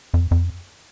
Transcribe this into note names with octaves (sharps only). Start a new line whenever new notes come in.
F2
F2